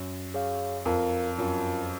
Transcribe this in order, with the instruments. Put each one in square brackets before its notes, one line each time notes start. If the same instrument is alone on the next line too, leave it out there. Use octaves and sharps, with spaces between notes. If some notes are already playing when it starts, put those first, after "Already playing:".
Already playing: [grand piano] F#2
[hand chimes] G#4 C#5 F5
[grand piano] F2 [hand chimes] F4 A#4 F5
[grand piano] F#2 [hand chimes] F4 A#4 F5